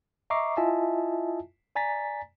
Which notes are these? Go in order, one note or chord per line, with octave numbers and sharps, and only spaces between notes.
D#5 E5 A#5 C#6 D6 C7
E4 F4 D#5 E5 G#5 A5
D5 G#5 A#5 A6 B6